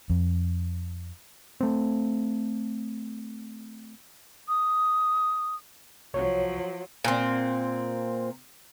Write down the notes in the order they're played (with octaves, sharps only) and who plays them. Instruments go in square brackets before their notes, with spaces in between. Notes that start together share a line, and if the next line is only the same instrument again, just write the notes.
[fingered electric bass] F2
[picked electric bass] A3 C4
[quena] D#6
[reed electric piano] C2 C#5 [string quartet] F3 F#3
[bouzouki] A#2 C4